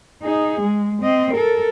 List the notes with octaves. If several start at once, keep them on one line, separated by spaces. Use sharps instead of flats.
D#4 G#4
G#3
C4 D#5
A4 A#4